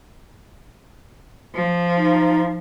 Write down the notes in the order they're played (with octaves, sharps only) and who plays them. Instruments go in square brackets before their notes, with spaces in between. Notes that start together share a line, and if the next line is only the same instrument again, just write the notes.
[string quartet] F3
[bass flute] D#4